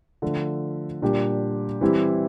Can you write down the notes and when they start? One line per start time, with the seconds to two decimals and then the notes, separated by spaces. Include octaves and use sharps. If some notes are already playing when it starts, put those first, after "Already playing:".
0.22 D3 F3 A3
1.02 A#2 G3 D4 G4
1.81 E3 G3 C4 E4 G4